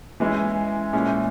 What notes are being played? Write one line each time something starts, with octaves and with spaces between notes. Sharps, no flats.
E3 G#3 C#4 E4
A#2 G#3 C#4 E4